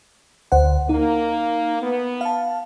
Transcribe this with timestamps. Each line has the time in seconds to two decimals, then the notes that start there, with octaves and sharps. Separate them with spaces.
0.52 D2 C5 F#5
0.89 A#3 D#4
1.81 B3
2.21 F5 A5